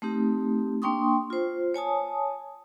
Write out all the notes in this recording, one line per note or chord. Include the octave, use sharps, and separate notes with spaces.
A3 C4 D#4 G4
A#3 D4 G5 C6 C#6 D#6
F4 C5
C#5 G#5 A5 D#6